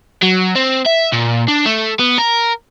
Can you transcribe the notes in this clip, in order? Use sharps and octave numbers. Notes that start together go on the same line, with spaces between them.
F#3
C4
E5
A#2
D4
A3
B3
A#4